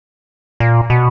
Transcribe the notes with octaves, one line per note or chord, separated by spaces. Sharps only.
A#2
B2